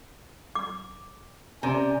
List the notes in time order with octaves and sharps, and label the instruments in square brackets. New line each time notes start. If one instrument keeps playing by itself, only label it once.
[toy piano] D6
[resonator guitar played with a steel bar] C3 [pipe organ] C#4 [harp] D5 A#5